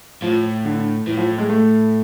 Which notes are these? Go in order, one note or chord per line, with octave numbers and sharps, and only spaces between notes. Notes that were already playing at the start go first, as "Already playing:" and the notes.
A2 F3
D3
A2 E3
F3
G#3
A3